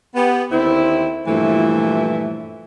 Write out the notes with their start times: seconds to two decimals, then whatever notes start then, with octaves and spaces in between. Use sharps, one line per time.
0.15 B3 G4
0.52 D#2 D3 C4 E4
1.28 G2 A#2 E3 F3 A3 E4